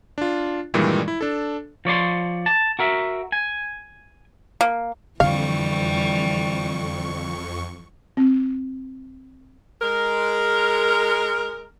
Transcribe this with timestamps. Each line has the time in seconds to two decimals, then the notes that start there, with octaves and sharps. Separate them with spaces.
0.18 D4 F4
0.74 G2 A#2 D#3 E3 G3 G#3
1.08 E4
1.21 D4 A4
1.85 F3 C#5 D5 C6
2.46 A5
2.79 F#4 A#4 E5
3.32 G#5
4.61 A#3
5.20 F2 D3 E3 G3 F5 C#6
8.17 C4
9.81 G#3 A#4